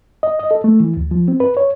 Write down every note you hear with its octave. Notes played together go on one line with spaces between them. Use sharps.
D#5
D#5
A4
A3
E3
D2
F3
C4
B4
C#5